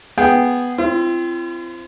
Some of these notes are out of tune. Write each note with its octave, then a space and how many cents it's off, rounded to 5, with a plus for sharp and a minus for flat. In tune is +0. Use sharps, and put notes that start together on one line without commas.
B3 +0 G#4 +0 G5 +0
C4 +0 F4 -45